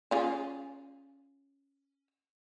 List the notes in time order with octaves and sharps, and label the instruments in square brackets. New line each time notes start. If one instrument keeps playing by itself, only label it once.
[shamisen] C#4 F4 G#4